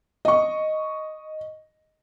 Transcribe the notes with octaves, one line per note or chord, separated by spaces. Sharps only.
D#5 C#6